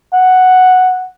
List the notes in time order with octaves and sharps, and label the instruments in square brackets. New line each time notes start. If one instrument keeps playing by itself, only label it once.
[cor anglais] F#5